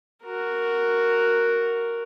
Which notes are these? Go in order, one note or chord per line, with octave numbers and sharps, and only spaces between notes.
F#4 A#4